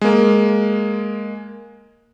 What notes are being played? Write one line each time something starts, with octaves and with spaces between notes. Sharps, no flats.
G#3 A#3